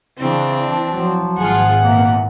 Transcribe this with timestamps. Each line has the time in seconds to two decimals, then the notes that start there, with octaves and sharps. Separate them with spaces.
0.19 C#3 E3 C4 D4
0.94 F3 F#3
1.38 G#1 G#2 F4 G#4 F#5
1.82 E2 A#2 A#3